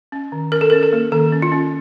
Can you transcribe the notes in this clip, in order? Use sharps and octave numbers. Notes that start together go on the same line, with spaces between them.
C#4
D#3
C#4 A#4
A4
C#4 A#4
A4
A#3
D#3 A4
C#4
F4
C#4